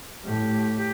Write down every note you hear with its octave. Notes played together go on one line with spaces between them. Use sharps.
A2 G4
G4